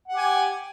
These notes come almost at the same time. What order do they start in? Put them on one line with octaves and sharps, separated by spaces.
F#5 G4 G#5